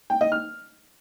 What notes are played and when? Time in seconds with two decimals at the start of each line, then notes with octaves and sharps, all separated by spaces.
0.10 G5
0.21 D#5
0.32 F6